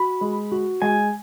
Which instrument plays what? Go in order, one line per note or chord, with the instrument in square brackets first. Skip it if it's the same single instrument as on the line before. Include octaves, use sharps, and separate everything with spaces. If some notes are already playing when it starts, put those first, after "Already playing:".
Already playing: [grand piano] F#4 [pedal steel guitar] B5
[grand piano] G#3
F#4
[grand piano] G#3 [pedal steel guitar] G#5